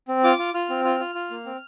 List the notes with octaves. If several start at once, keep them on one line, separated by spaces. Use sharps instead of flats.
C4
F4 D6
F4
F4 F6
C4
F4 F6
F4
F4
A#3
C4